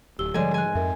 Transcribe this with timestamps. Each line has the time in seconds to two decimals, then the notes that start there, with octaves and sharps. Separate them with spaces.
0.19 D1 G4 E6 G7
0.34 G#2 D3 F3 G3 A4 C#5 D5 G#5
0.54 G#4 G#5 F#6
0.75 F2 A#4 E5